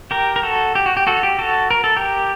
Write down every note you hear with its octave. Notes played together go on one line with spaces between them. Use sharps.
G4 A#4
A#4
F#4 A4
G4
F#4
G4
F#4 A4
G4
F#4 A4
A#4
A4
G4 A#4